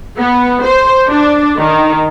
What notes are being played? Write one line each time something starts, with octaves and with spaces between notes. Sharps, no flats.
B3
C5
D4
D#3